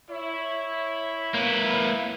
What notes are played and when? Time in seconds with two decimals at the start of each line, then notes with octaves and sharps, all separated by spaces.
0.10 E4 C#5
1.35 A#3 B4